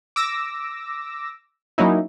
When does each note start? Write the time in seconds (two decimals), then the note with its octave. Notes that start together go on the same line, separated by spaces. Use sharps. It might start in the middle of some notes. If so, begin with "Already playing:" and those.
0.16 D6 E6 A#6
1.78 F#3 A#3 C#4 D#4 E4